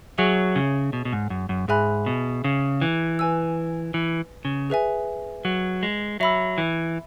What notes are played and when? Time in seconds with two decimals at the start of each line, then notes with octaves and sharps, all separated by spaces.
0.18 F#3 G#4 C#5 E5 G#5 C#6
0.56 C#3
0.93 B2
1.05 B2
1.13 G#2
1.30 F#2
1.49 F#2
1.68 G#2 G#4 E5 G#5 B5 F#6
2.06 B2
2.44 C#3
2.81 E3
3.19 B4 G#5 E6
3.94 E3
4.45 C#3
4.70 G#4 B4 E5 G#5
5.45 F#3
5.83 G#3
6.20 F#3 E5 B5 E6
6.58 E3